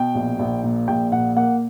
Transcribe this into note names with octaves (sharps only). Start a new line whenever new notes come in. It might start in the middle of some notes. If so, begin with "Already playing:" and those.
Already playing: B2 G5
A#1
A#1
A#2
A#1 G5
A#2 F#5
A#3 F#5